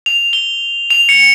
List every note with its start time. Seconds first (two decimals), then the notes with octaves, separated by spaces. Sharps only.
0.06 F7
0.33 G7
0.90 F7
1.09 C#7